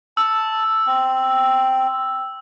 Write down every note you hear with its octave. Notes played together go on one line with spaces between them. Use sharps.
A5 E6
C4